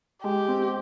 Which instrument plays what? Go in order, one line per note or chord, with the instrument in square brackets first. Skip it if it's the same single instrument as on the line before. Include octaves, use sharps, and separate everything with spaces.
[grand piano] G#3 [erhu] G4
[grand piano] C4